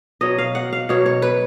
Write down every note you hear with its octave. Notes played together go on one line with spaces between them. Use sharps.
B2 F#3 D#5
F5
F#5
F5
B2 F#3 C#5
C#5
B4